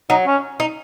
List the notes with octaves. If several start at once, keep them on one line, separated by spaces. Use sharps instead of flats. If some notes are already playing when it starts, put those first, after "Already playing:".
F#3 D#4
C#4
D#4